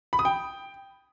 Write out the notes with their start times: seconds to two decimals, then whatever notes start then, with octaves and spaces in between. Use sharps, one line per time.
0.13 B5
0.19 D#6
0.25 G5